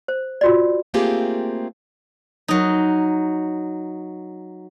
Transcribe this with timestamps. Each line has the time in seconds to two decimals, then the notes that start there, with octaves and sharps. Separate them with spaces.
0.08 C5
0.41 F4 F#4 D5
0.94 A3 A#3 C4 F4 G4 G#4
2.48 F#3 D#4